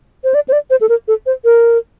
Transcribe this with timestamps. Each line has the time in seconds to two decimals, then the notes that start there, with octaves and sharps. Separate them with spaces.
0.24 C5
0.34 D5
0.49 C5
0.53 D5
0.70 C5
0.81 A4
0.89 A#4
1.08 A4
1.26 C5
1.45 A#4